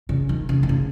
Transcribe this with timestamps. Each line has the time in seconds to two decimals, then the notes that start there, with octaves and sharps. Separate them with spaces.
0.09 C#3
0.29 D#3
0.49 C#3
0.63 D#3
0.69 C#3